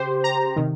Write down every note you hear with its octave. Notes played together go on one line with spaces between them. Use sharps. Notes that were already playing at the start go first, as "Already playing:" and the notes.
Already playing: C#3 G4 C5
A#5
C3 D#3